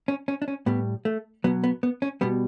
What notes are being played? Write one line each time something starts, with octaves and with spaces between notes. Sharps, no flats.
C#4
C#4
D4
C#4
A2 G3 B3
A3
B2 F#3 B3
B3
B3
C#4
B2 G3 B3